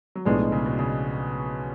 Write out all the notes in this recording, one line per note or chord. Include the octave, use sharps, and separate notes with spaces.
F#3
B1 A2 F3 G#3 B3 D4
F3
C#3
B2
C#3